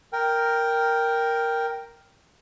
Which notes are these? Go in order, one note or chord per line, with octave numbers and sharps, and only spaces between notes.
A#4 G5